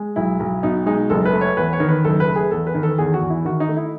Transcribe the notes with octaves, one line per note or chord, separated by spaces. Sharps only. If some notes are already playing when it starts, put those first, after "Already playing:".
Already playing: G#3
B1 E4
B1
B2 D#4
G#3 D#4
F#1 A4
B4
A3
C#5
E2 B4
C#5
D#3
B4
F#1 A4
B4
A3
G#4
E2 A4
B4
D#3
A4
E2 G#4
F#4
E2
E4
D#3 F#4
D#4
A3
E4